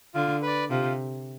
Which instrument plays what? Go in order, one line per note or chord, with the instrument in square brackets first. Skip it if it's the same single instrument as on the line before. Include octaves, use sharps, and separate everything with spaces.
[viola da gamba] D3 [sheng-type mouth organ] F4
[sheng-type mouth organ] B4 D5
[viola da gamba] C3 [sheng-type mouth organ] F4